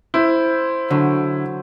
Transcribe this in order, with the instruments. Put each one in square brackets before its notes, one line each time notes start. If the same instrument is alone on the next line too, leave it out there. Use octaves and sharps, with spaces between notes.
[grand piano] E4 [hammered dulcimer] C5
[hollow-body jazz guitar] D3 [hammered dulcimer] F#3